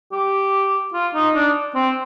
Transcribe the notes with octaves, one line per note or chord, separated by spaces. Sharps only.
G4
F4
D#4
D4
C4